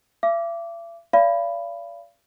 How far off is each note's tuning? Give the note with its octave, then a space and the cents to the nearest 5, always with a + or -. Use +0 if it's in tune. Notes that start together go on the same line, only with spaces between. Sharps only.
E5 +40 D6 -10
D5 -35 F5 -35 B5 +5